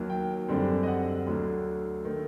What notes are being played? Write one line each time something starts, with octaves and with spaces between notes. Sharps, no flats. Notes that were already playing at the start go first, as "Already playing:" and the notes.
Already playing: D#2 D#3 F#3
G5
F#2 D3 G3 C4
D#5
F#5
D2 D3 F#3
D#3 A3